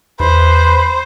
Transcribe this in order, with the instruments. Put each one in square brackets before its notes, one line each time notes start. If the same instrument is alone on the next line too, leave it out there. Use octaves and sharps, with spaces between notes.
[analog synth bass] E2 [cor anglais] B4 [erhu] C5